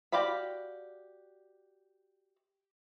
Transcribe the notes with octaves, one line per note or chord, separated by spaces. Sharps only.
F#4 G4 D5 F5 B5